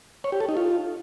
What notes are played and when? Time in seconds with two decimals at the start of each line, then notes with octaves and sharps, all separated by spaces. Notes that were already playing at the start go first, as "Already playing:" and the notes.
0.24 C#5
0.32 G4
0.40 A4
0.49 D#4
0.57 F4